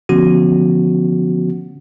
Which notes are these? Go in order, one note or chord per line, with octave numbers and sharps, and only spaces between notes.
D3 F3 A3 B3 C#4 F#4